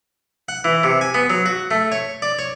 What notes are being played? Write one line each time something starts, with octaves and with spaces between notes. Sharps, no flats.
F#5
E3
C3
G#5
B3
F#3
F#4
A3
C#5
D5
C#5